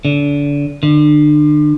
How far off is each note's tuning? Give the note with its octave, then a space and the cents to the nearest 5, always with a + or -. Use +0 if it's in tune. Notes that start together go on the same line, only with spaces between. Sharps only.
D3 -30
D3 +35